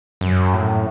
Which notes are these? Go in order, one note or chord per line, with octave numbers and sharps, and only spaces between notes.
F#2
A2